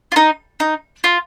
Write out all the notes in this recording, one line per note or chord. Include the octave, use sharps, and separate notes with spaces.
F4
D#4
D#4
F4